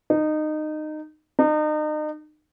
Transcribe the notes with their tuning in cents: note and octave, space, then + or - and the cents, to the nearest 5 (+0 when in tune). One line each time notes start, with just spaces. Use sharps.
D#4 -20
D#4 -35